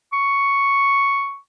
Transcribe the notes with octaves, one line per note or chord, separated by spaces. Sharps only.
C#6